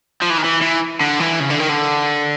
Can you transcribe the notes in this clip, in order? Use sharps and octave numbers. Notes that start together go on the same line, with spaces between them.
F3
E3
D#3
E3
E3
D3
E3
C#3
D3
D#3
D3